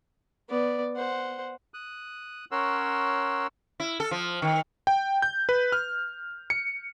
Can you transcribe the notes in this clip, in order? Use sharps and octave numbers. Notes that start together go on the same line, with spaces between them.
B3 D5
C5 F#5
D#6 F#6
C#4 A#4 C#5 F#5 C6 E6
E4
A4
F3
D#3
G5
G6
B4
F6
C#7